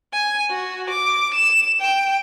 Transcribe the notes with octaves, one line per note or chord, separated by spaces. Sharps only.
G#5
F#4
D6
E7
G5